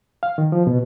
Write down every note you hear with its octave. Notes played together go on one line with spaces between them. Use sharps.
F5
D#3
F3
B2